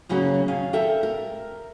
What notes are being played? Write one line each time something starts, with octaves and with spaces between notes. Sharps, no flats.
F#2 C#3 F#3 A#3 C#4
D#3 C#4 F5 G#5
A4 A#4 E5 G5
A#4